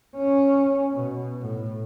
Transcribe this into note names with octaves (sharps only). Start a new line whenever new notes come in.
C#4
B2
A2